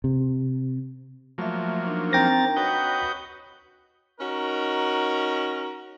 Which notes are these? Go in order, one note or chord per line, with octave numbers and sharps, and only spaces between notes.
C3
F3 F#3 A3 A#3 E5
D4 D#4 A#4
C4 G5 A#5 A6 A#6
F#4 B4 C#5 D#5 G6
C#4 D#4 F#4 A#4